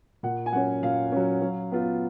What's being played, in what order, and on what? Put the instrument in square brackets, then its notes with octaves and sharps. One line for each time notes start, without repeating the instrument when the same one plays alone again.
[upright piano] A#2 F#5
G#5
F#3 C#4 F#5
A#2 F5
F#3 C#4
F#3
B3 F4